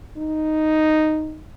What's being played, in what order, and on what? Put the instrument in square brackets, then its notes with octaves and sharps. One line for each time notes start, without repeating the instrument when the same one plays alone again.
[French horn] D#4